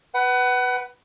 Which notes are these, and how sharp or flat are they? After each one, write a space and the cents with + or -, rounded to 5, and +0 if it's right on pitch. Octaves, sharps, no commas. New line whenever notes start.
B4 +0 F#5 +25